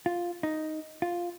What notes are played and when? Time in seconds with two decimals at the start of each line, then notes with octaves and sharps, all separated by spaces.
0.06 F4
0.43 D#4
1.02 F4